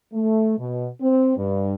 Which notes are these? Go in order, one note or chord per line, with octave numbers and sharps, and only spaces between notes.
A3
B2
C4
G2